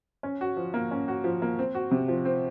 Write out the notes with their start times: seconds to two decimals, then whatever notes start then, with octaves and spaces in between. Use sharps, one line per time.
0.23 C#4
0.41 F#4
0.57 F3
0.74 A#3
0.91 C#4
1.08 F#4
1.24 F3
1.42 A#3
1.59 C4
1.75 F#4
1.91 C3
2.08 F3
2.25 C4